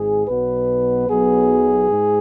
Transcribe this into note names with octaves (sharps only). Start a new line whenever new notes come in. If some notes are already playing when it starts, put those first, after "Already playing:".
Already playing: G#1 G#2 G#4
B1 B2 F#3 B3 B4
B1 B2 F#3 B3 G#4
G#2